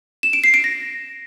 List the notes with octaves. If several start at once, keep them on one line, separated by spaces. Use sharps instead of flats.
E7
D7
C7
D7
A#6